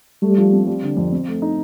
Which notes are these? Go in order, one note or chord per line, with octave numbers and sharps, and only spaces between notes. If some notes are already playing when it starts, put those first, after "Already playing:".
G3 A3
F3
C4
G3
D3
F2
C4
A3
D#4